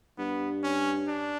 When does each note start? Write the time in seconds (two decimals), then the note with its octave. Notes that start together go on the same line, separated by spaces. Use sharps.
0.18 G2 B3
0.63 C#4
1.08 D4